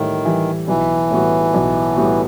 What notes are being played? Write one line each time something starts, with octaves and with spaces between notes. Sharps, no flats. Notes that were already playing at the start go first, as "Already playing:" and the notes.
Already playing: A2 D#3 E3 G3
E3 G3
B1 E3
A2 G3 B3 F#4
B1
A2 G3 B3 F#4